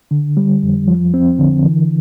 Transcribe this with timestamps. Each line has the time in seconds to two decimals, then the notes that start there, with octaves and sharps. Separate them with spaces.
0.11 D3
0.37 G3
0.63 F2
0.88 F3
1.14 C4
1.39 D3
1.65 E3